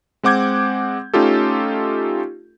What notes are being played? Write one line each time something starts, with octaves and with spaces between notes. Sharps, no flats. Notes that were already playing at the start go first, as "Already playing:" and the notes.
G#3 C4 F#5 D6 G6 G#6
A3 C#4 D#4 F4 G4 A4